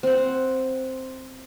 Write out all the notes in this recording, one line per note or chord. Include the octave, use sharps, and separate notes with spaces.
C4 F#5